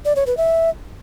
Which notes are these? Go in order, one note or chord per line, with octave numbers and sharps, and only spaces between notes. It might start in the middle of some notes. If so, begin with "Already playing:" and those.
D5
C#5
B4
E5